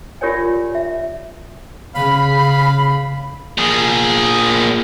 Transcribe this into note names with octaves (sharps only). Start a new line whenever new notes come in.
F4 G4 A#4 C#5 D5 G#5
E5
C#3 F5 B5
A#2 G#4